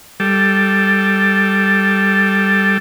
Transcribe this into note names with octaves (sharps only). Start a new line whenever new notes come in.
G3 A4